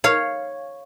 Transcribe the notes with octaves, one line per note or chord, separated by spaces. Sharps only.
C#5 F5